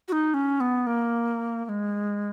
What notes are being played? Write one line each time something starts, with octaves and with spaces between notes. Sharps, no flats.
F#4
D#4
C#4
B3
A#3
A#3
G#3